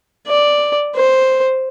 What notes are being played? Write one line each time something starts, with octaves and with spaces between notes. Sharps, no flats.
D5
C5